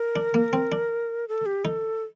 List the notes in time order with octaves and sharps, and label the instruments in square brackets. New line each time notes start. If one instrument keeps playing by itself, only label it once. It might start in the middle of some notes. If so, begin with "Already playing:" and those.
Already playing: [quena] A#4
[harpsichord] D4
A#3
C4
D4
[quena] A4
G4
[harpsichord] D#4 [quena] A4